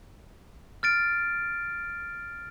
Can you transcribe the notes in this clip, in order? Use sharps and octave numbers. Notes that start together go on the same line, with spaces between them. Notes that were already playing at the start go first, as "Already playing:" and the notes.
F6 A6 D7